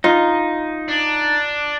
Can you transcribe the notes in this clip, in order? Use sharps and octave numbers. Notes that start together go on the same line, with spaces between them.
D#4 F4
D4